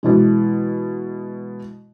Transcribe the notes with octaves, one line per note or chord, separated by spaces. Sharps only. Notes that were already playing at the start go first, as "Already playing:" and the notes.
B2 E3 G#3